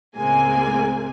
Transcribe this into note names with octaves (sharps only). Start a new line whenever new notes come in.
C#2 A2 G#3 A#3 C4 G#5